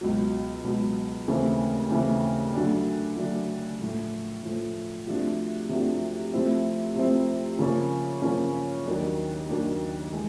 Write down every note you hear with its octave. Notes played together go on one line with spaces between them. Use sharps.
C#2 B2 F#3
C#2 B2 F#3
D#2 C#3 E3 A3 C4
D#2 C#3 E3 A3 C4
D3 F#3 A3 D4
D3 F#3 A3 D4
A2 F3 A3
A2 F3 A3
C3 F3 A3 D4 F#4
C3 F3 A3 D4 F#4
C3 F3 A3 C4 E4
C3 F3 A3 C4 E4
C#3 F3 A#3 C#4
C#3 F3 A#3 C#4
D#2 D#3 F#3 A#3 D4
D#2 D#3 F#3 A#3 D4
E3 G#3